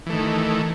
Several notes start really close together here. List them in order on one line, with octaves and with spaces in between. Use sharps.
E3 A3 D#3